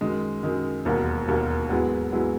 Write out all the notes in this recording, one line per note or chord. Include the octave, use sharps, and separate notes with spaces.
F#2 D#3 G#3
F#2 D#3 G#3
E1 D#2 D#3 F#3 A#3
E1 D#2 D#3 F#3 A#3
G#2 F#3 B3 E4 G#4
G#2 F#3 B3 E4 G#4